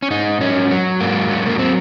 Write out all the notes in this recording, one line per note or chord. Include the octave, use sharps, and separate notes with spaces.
C#4
G#2 D#4
F#3 C#4
F#3
G#2 A#3
F#3
A#3
C4